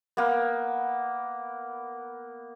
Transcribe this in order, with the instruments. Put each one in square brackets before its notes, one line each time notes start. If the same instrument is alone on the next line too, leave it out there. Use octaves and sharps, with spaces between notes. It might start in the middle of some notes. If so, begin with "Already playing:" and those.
[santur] A#3 B3